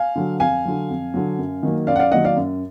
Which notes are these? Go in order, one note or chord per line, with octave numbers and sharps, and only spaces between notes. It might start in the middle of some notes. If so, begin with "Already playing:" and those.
Already playing: F5 G#5
D3 F#3
F2 F5 G#5
D3 F#3
F2
D3 F#3
F#2
D#3 F#3 A#3
F#2 D5 F5
F#5
D5 F5
D#3 F#3 A#3 D#5 F#5
D5 F5
F#2